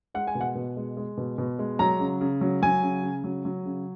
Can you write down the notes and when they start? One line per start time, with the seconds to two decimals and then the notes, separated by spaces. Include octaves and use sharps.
0.14 G#3 F#5
0.27 G#5
0.35 B2
0.41 F#5
0.55 B2
0.77 G#3
0.97 G#3
1.17 B2
1.38 B2
1.59 G#3
1.79 F#3 A#5
2.00 C#3
2.21 C#3
2.41 F#3
2.62 F#3 G#5
2.83 C#3
3.03 C#3
3.24 F#3
3.45 F#3
3.66 C#3